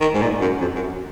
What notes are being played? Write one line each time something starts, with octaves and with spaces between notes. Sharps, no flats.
D#3
G#2
A#2
F#2
F2
F#2